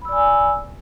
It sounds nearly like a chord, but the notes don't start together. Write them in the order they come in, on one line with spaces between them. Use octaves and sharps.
B5 E6 D5 G#5